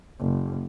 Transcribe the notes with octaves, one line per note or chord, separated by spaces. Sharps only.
F#1